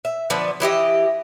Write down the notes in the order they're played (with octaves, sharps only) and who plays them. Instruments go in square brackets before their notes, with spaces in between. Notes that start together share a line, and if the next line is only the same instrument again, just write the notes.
[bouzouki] E5
D3 F3 B3 D5
E3 E4 G4 D#5